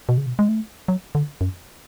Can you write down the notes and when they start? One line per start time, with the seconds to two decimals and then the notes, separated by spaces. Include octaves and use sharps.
0.09 B2
0.18 C#3
0.26 B2
0.39 G#3
0.49 A3
0.88 F#3
1.15 D3
1.41 F#2